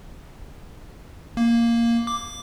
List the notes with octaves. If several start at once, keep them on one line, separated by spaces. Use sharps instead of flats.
A#3
D6